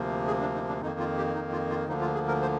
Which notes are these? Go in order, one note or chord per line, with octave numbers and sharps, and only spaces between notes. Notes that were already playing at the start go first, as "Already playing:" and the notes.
Already playing: D2 C3 F3 A#3
G#4
D4
D#4
D4
F2 D#3 A#3 D#4
F4
G4
D#4
F4
F4
D2 D3 F3 A#3 D#4
F4
G#4
A#4
C5